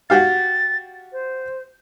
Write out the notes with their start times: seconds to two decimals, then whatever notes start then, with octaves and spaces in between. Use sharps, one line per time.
0.10 F#4 G4 F5 A6
1.12 C5